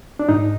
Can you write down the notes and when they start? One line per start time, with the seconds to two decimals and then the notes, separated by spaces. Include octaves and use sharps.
0.19 D4
0.29 G#2 D#4